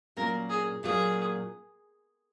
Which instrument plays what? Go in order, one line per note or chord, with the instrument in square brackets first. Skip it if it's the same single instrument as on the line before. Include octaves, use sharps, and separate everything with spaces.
[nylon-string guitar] A#2 F#3 A#3 C#4 [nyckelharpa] A#4
[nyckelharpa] G#4
[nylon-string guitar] A#2 F#3 A#3 C#4 [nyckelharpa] G#4